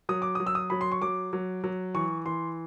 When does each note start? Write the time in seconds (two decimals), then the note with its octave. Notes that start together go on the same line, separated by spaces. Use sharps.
0.09 F#3 D#6
0.22 D6
0.35 F#3 D#6
0.47 E6
0.55 D#6
0.70 F#3 B5
0.81 C6
0.92 C#6
1.02 F#3 D6
1.33 F#3
1.64 F#3
1.94 E3 C#6
2.26 E3 C6